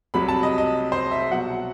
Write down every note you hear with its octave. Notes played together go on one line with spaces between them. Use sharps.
C2 C3 F#3 B5
A5
D#5
D#5
C5
E5
C2 B2 F#3 F#5